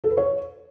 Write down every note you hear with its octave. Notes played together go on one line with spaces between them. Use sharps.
A4
B4
C#5